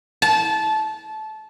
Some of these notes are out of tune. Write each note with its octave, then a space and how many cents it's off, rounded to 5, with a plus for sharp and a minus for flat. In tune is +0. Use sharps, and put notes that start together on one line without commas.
A5 -20